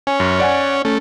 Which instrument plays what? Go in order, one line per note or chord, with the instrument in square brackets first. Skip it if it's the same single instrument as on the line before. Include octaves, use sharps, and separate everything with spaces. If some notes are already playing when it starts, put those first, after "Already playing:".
[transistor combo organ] C#4 [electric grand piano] G#5
[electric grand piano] F#2
D5 F#5 G#5
[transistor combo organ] A3 [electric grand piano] C#4